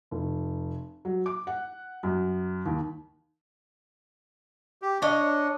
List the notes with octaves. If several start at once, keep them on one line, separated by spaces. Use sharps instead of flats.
F1
F#3
D6
F#5
F#2
D#2
G4
D4 C#5 D#5